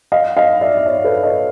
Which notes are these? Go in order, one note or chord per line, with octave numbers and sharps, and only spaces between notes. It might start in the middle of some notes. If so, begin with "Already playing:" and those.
D#5 F5
D#5 F5
D5 E5
E5
C#5 D#5
A4 B4
C#5 D#5